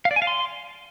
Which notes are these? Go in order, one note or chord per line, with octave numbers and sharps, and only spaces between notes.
F5
D5
G#5
F5
C6